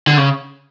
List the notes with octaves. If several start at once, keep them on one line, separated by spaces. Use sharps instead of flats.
D3
C#3